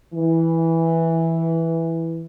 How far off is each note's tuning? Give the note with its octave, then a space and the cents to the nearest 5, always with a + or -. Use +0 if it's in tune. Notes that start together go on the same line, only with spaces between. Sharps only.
E3 -5